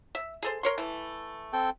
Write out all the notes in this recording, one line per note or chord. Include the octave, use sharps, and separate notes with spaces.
E5
G#4 A4 C5
A#4 C#5 C6
E3 A3
C4 A4 G5